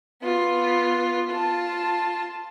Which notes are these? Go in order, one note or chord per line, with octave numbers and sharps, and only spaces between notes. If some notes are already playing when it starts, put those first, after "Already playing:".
B3 F4
F4 A5